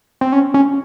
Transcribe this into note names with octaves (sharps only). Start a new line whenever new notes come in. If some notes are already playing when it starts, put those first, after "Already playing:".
C4
C#4
C#4